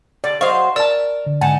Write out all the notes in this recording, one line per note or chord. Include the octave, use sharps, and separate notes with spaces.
D3 D5
F#3 C5 D#5 F5 C#6
A#4 D5 A5 E6
D3
G#2 D3 D#4 F#5 G#5 A5